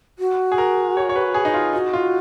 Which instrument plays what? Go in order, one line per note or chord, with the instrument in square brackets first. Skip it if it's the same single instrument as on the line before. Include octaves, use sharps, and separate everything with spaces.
[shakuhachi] F#4
[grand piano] G#4
A#4
C#5
C#5
B4
G#4
D#4
F4
[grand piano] D#4 [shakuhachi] F#4
[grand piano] F4